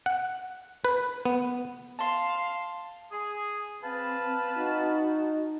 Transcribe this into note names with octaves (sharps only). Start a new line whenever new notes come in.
F#5
B4
B3
F5 A5 C6
G#4
C4 B4 F5 A5
D#4 F#4